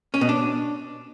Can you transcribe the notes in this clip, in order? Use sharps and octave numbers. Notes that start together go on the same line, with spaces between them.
C#4
B2
D4